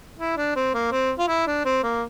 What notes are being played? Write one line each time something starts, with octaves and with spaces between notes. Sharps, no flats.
E4
D4
C4
A#3
C4
F4
E4
D4
C4
A#3